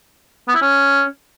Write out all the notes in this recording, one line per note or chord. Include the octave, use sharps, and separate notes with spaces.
B3
E4
C#4